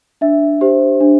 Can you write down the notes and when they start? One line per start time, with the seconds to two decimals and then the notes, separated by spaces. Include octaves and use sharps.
0.21 D4 E5
0.61 G4 C5
1.01 D4